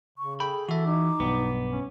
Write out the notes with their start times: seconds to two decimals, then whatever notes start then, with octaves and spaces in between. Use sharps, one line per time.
0.18 C#3 C#6
0.40 G#4 A4 G5 B5
0.69 E3 F#4 A4 E5
0.85 D#4 D6
1.20 B1 G2 B3
1.71 C#4